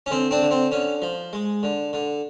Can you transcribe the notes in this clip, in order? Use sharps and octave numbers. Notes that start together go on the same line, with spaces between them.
C#4
D3 C4
C4 D4
D3
C4
D3 C#4
F3
G#3
D3
D3